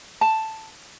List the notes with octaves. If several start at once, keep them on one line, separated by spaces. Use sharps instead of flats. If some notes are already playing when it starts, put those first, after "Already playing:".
A5